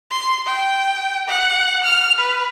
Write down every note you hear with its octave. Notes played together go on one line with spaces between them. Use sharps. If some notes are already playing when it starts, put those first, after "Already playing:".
C6
G5
F#5
F6
B4